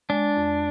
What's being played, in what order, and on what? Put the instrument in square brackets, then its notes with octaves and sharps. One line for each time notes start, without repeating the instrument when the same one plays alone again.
[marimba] G#3 [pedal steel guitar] D4
[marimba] F2